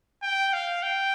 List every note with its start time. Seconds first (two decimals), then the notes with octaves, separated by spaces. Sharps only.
0.23 G5
0.53 F5
0.83 G5